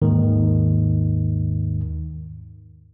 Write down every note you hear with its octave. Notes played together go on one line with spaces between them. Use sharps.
D#2 G#2 D#3